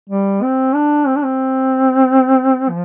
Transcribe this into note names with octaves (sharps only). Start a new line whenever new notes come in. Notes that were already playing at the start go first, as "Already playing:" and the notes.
G3
C4
D4
C4
D4
C4
F3